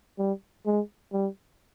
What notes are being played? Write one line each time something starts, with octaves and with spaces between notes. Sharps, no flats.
G3
G#3
G3